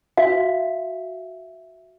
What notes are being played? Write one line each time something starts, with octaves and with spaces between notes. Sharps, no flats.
F#4 E5 F5